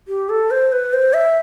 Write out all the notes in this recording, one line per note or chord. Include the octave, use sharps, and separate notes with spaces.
G4
A4
C5
B4
C5
E5